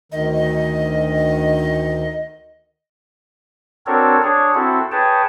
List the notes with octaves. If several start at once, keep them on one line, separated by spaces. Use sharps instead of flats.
D2 D#3 D#5
C4 D4 F#4 A4 A#4 C#5
D4 G#4 C#5
C4 E4 F#4 A4
G#4 B4 C#5 G5 A5